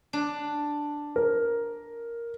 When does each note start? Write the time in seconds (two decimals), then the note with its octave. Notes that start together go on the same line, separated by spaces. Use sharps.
0.13 D4
1.16 A#4